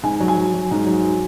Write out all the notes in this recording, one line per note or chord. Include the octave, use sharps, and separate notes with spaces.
G#2 G#5
F#3
G#5
F#3
F#3
G#2
F#3